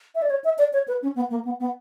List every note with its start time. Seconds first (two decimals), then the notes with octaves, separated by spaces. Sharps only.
0.15 E5
0.22 D5
0.30 C#5
0.44 E5
0.58 D5
0.73 C#5
0.88 B4
1.02 C#4
1.16 B3
1.30 A#3
1.45 B3
1.60 B3